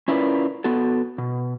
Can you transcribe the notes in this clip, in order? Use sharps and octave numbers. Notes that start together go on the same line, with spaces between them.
C#4 E4 F4 A#4 B4 D5
B3 F#4 A4
B2